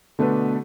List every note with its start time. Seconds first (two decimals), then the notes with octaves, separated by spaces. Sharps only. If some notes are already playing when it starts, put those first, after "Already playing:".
0.19 B2 D3 A3 D4 B4